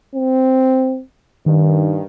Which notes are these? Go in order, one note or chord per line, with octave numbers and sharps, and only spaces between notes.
C4
G2 D#3